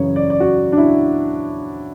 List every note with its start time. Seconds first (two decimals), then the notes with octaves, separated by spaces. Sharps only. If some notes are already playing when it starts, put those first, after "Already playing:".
Already playing: F#2 C#3 E3 C#5
0.16 D5
0.30 D5
0.40 F#4
0.72 D4
0.78 E4